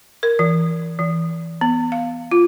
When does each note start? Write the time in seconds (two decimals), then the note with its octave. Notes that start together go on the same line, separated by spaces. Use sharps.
0.23 A#4
0.39 E3
0.99 E3
1.61 B3
1.92 F5
2.31 F4